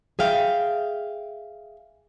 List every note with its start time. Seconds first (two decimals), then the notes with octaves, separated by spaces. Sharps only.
0.19 G#4 E5 F5 G5